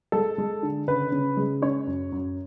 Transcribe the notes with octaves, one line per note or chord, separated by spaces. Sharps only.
G#3 A4
G#3
D3
C#3 B4
C#3
G#3
C#4 C#5
F#2
F#2